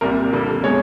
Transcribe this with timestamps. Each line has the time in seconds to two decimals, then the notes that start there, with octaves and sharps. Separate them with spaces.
0.01 C2 A#2 G3 A#4
0.33 F2 D3 G3 A#3
0.64 B2 G#3 C#5